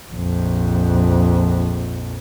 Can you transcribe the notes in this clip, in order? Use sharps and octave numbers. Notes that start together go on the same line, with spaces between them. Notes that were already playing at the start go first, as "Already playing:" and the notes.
A#1 F2